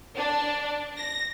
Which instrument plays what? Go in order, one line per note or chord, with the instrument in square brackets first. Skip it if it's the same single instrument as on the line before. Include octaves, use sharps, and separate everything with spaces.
[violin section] D4
A#6